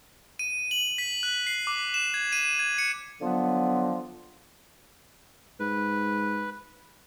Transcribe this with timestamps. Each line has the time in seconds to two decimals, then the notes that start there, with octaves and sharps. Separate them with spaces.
0.39 D#7
0.71 F#7
0.98 B6
1.23 F#6
1.47 C7
1.67 D6
1.94 E7
2.14 G#6
2.32 D#7
2.59 G#6
2.78 C#7
3.21 D3 F3 F#3 B3
5.60 G#2 B4